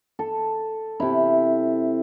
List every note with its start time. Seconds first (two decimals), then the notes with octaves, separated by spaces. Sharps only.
0.19 A4
1.00 C3 E4